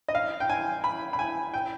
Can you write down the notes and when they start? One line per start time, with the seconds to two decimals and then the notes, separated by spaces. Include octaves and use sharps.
0.08 D#5
0.15 F5
0.40 G5
0.50 G#5
0.84 B5
1.13 B5
1.19 G#5
1.54 G5